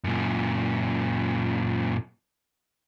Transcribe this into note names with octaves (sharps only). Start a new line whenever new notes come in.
F#2 A#2